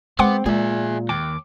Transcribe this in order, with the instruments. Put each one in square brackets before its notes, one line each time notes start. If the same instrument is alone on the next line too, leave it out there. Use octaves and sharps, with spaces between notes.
[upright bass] G#3 [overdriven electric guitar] B3 [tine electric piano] C4 [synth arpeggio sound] F#5 C6 D6
[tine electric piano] A#2 [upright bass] G#3 [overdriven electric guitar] G#4 E5
[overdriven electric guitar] D#2 [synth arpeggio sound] G5 [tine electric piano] D6